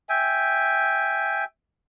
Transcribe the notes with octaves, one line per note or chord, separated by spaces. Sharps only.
E5 G5 G#5